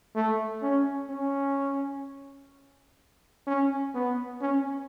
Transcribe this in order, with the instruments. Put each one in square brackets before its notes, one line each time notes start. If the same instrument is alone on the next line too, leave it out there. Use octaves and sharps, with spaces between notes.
[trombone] A3
C#4
C#4
C#4
B3
C#4